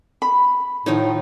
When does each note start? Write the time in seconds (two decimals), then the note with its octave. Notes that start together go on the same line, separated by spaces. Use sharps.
0.22 B5
0.86 A2 D#3 F3 D#4 C#5